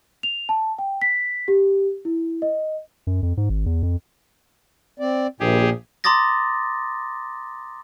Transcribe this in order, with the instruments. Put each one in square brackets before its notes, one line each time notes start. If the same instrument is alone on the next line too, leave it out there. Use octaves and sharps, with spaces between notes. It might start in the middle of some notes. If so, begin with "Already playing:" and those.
[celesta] F7
A5
G5
B6
G4
E4
D#5
[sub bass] F#2
F2
G#2
G#1
E2
F2
[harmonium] C4 D5
[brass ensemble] A#1 [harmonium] A#2 [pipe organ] G4 G#4
[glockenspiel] A#5 C6 D6 D#6 A6 A#6